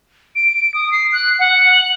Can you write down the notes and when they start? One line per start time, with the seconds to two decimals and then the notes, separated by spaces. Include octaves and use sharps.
0.35 D7
0.74 D#6
0.92 C7
1.12 F#6
1.39 F#5
1.72 F#7